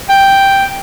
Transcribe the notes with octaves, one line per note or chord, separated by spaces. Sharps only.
G5